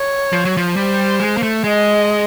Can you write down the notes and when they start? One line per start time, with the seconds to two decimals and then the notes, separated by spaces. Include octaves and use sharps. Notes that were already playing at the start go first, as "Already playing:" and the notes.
Already playing: C#5
0.33 F3
0.45 F#3
0.57 F3
0.76 G3 C5
1.20 G#3
1.37 A#3
1.43 A3
1.64 G#3 D#5